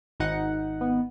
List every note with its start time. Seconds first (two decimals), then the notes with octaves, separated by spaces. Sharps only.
0.20 G#1 D#4 F#5
0.81 B3